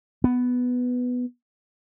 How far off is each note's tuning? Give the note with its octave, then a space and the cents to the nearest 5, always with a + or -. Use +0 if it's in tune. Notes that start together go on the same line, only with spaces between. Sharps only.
B3 +5